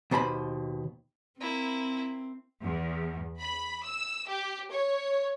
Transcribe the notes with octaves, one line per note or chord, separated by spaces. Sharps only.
D#2 B2 C5 A#5 B5
A#3 C4 E4
E2
B5
E6
G4
C#5